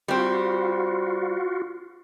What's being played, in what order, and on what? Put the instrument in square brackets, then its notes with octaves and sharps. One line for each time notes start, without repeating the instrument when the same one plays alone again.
[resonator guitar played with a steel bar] G3 C4 [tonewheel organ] F4 F#4